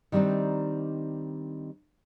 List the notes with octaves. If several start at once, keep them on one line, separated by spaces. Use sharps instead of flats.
D#3 G3 C4 D4 D#4